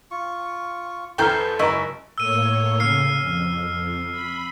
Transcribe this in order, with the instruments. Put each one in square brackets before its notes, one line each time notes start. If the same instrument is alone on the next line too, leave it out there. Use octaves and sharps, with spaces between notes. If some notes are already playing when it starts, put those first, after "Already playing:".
[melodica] F4 C#6
[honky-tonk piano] E2 E4 [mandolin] A4 C5 G6 [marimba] G5 A#5 F6
[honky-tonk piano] F#1 C#6 [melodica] G#3 [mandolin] E4 [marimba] D#5 A#5
[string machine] A2 A#3 C#5 [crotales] E6 D#7
[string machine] C#3 [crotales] F6 C7
[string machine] F2
B5